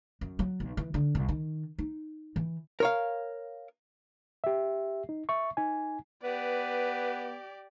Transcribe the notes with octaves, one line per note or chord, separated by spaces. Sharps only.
F#2
F#3
B1
E3
D3
C2
D#3
D#4
E3
A#4 C#5 F5
G4 E5
D#4
E5 C#6
D#4 G#5
B3 G4 B4 D5